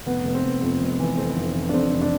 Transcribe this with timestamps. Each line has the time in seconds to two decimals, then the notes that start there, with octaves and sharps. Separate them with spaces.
0.06 F1 B3
0.25 F1
0.34 C4
0.44 F1
0.62 F2
0.81 F1
0.99 E3
1.17 F2 C4
1.36 F1
1.55 E3
1.69 D4
1.73 F2 C4
1.92 F1
2.01 D4